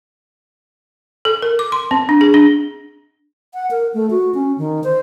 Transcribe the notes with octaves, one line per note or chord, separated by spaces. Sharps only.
A4
A#4
D6
C6
C4
D4
G#4
D4
F#5
A#4
A3
F#4
C#4
D#3
C5